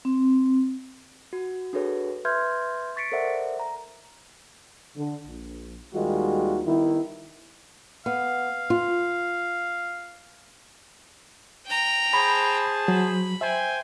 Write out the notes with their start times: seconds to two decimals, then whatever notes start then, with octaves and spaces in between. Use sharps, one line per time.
0.05 C4
1.33 F#4
1.73 D4 F#4 G#4 A4 B4 C#5
2.25 B4 E5 C6 F6 G6 G#6
2.96 C#6 A6 B6 C#7 D7
3.12 A4 A#4 C5 D5 E5 F#5
3.60 A#5
4.97 D3
5.26 A#1
5.94 D#2 D#3 G3 G#3 F4 F#4
6.66 D#3 G3 B3 E4
8.06 B3 F5
8.70 F4
11.67 G5 A#5
12.13 G#4 C5 A5 B5
12.88 F#3 B5
13.41 C5 E5 G5 G#5